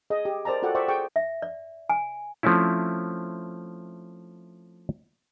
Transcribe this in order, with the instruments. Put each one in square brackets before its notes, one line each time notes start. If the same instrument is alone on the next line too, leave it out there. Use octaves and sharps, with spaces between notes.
[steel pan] G#4 D#5
G4
A#4 C5 D5 A5 A#5
F4 F#4 A4 D5 F#5 G5
C5 D5 E5 G5 C#6 D6
G#4 G5 C#6 D6
[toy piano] E5
D5
G#5
[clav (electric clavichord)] F3 A3 C4 C#4 E4